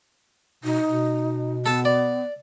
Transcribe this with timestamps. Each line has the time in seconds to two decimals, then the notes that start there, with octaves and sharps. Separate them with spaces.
0.64 B2 D#4
0.88 B2
1.66 B3 A4 A5
1.85 D5